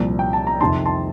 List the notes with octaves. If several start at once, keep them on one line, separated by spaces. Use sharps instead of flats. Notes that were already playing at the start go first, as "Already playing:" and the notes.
Already playing: C2 A#2 F3
G5
A5
A#5
F2 C3 D#3 A5 C6
A5 C6